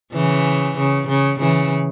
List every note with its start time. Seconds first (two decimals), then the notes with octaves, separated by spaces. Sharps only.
0.13 C#3 E3
0.77 C#3
1.08 C#3
1.39 C#3 E3